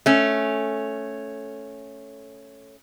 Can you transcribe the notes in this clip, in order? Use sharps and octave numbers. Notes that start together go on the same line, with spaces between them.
A3 C#4